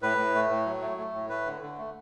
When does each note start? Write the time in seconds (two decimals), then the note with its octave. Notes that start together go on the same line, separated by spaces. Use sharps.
0.02 A2 B4
0.18 A2
0.35 A3
0.49 A2
0.66 F#3
0.81 A3
0.98 A3
1.14 A2
1.29 A3 B4
1.46 D3
1.62 D3
1.78 A3